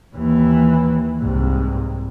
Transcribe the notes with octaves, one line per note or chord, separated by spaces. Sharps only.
D#2 E3
C2 G#2